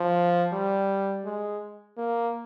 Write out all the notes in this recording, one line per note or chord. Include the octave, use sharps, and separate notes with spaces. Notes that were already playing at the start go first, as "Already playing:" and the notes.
Already playing: F3
G3
G#3
A#3